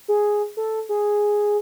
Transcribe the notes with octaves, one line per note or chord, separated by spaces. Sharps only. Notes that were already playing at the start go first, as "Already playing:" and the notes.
G#4
A4
G#4